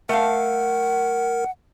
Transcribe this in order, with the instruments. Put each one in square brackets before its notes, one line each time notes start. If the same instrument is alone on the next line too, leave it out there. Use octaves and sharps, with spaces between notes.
[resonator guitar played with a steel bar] A3 F5 [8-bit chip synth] A#4 [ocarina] F#5